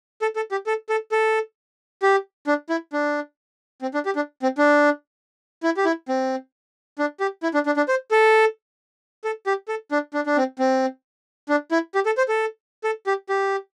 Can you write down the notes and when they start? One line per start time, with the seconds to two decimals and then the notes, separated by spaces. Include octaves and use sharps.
0.22 A4
0.36 A4
0.51 G4
0.67 A4
0.89 A4
1.12 A4
2.03 G4
2.47 D4
2.70 E4
2.93 D4
3.82 C4
3.94 D4
4.06 G4
4.16 D4
4.43 C4
4.58 D4
5.63 E4
5.77 G4
5.85 E4
6.09 C4
6.99 D4
7.20 G4
7.43 E4
7.54 D4
7.66 D4
7.77 D4
7.88 C5
8.11 A4
9.24 A4
9.47 G4
9.68 A4
9.91 D4
10.14 D4
10.26 D4
10.37 C4
10.59 C4
11.49 D4
11.72 E4
11.95 G4
12.06 A4
12.18 C5
12.28 A4
12.84 A4
13.07 G4
13.29 G4